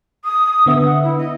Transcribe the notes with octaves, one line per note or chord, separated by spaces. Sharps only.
D#6
D3 B3 E5
F#5
E4
D#5